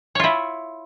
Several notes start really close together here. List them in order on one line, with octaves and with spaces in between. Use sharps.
C#5 F4 E4